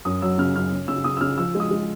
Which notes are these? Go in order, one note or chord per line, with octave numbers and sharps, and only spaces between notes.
F#2 D#6
F#3 E6
C#3 F6
F#2 F6
C#3
C#3 E6
C#3 D#6
E6
C#3 F6
F3 E6
G#3
D#6
G#3